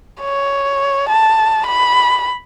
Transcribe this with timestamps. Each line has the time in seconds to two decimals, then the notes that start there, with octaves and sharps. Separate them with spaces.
0.21 C#5
1.09 A5
1.67 B5